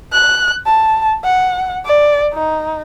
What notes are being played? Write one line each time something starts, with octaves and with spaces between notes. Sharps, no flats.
F#6
A5
F#5
D5
D#4